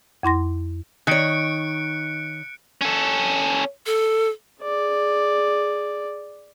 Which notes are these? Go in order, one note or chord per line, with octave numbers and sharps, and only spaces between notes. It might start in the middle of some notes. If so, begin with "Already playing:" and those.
F2 E4 C6 A#6
D#3 C#5 F#6 C#7 D7
C#4 A4
A4
G#4 D5